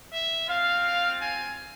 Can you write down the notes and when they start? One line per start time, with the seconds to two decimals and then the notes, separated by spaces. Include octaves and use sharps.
0.13 E5
0.49 C4 F4 F5
1.21 G#5